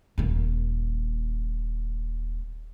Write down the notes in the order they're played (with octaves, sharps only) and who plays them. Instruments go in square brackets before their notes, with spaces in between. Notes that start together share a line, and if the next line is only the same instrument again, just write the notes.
[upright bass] D#1 A#3